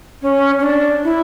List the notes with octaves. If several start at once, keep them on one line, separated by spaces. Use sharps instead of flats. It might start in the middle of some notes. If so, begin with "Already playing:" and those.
C#4
C#4
D4
E4